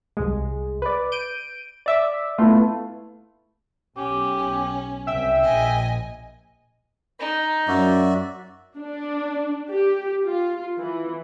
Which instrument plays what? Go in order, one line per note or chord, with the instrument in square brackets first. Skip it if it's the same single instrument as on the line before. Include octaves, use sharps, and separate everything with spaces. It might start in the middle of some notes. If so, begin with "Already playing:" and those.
[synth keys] C2 G#3
B4 D5
G6 D7 D#7
D5 E5 D6
[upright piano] A3 B3 E4 [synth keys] F4
[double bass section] B1 [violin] C#4 [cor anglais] G4
[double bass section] C2 [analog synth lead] E5 [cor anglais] G5
[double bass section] A#1 [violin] D#5 G#5
[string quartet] D#4
[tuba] F#2 [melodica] F#4 D5 E5
[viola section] D4
G4
F4
E3